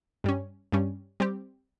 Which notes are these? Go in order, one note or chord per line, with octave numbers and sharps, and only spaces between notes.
G2 G3 C#4
G2 G3 C#4
G3 C4 G4